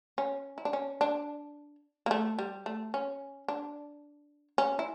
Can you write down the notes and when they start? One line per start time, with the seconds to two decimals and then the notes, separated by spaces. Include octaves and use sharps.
0.18 C#4
0.58 E4
0.65 D4
0.73 C#4
1.01 D4
2.06 A#3
2.11 A3
2.39 G3
2.66 A3
2.94 C#4
3.48 D4
4.58 C#4
4.79 E4